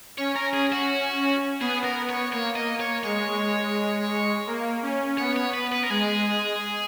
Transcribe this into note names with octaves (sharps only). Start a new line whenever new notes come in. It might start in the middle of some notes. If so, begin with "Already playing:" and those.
C#4 C#5
A#4
G#4
F#4
B3 G#4
A#4
C#5
A#3 C#5
D#5
C#5
G#3 C#5
A#3
C#4
B3 C#5
C#5
B4
B4
A#4
G#3 G#4